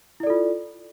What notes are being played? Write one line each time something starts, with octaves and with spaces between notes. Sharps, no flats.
E4 F4 A4 D5